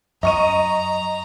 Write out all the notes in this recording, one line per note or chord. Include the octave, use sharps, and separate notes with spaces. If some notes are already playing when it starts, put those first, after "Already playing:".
F#2 D#5 A#5 C#6 D#7